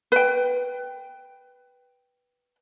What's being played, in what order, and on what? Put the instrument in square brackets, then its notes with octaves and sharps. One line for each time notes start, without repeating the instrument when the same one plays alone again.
[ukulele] B4 G5